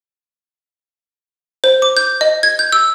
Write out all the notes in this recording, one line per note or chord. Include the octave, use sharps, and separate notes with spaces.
C5
D6
G6
D#5
G#6
G6
E6